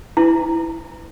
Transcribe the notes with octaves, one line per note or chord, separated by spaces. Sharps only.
E4